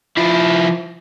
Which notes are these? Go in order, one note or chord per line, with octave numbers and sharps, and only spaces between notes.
F3 E4